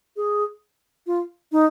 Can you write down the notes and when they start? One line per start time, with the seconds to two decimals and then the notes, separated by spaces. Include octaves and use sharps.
0.16 G#4
1.07 F4
1.52 D#4